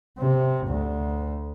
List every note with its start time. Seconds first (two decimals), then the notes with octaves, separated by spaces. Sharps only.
0.19 C3
0.68 D2